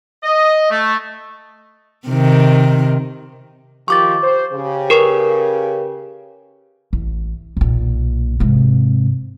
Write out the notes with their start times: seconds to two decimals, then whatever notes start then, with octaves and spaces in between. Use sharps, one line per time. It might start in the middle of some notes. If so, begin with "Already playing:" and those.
0.22 D#5
0.70 A3
2.08 C3 D#3
3.88 D#3 F3 G4 C#6 D6 A6
4.23 C5
4.53 C#3 G4
4.90 A#4 B4 C#6
6.93 A1
7.57 B1 A#2
8.40 G#2 C3